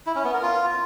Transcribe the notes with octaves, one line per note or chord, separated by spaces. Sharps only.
E4
C#4
B3
A#4
F4